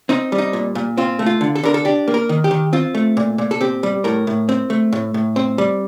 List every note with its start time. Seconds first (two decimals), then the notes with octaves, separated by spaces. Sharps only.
0.09 C4 D#4
0.32 G3
0.38 D#4
0.53 A#2
0.75 A#2
0.97 C4 F4
1.19 A3
1.26 F4
1.41 D3
1.55 A4
1.63 D3 A#4
1.74 A4
1.85 D4 G4
2.08 A#3
2.14 A#4
2.29 D#3
2.44 G4
2.51 D#3
2.73 C4 F4
2.95 A3
3.17 A#2
3.38 A#2
3.51 A4
3.61 C4 G4
3.83 G3
4.04 A2 A#4
4.27 A2
4.49 C4
4.70 A3
4.92 A2
5.14 A2
5.36 C4
5.58 G3